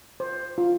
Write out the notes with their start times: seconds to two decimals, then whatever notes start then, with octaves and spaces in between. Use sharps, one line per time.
0.20 C5
0.58 F4